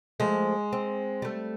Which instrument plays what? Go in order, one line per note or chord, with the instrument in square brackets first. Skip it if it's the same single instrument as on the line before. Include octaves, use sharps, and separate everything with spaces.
[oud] F3 A3 [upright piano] G#3
[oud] C4
G3 A3